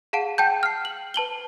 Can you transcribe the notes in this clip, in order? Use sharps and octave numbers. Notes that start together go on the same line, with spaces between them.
G#4 F5 F#5 A5 D7
F#5 G5 A5 G6
F6 C7
F#7
B4 A5 F#7 G7